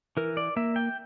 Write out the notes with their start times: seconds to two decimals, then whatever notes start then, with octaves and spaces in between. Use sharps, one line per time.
0.17 E3 A#4
0.37 D5
0.56 A#3 E5
0.76 G5